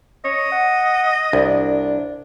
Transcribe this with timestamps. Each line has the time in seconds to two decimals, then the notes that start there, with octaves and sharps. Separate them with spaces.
0.25 C#5 D#5
0.52 F#5
1.33 C2 D4